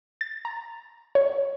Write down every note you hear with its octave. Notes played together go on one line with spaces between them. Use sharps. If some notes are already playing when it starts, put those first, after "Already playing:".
A6
A#5
C#5